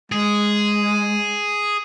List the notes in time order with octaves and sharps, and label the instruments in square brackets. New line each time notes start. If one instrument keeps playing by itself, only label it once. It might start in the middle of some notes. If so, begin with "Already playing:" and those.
[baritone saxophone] G#3 [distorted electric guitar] G#4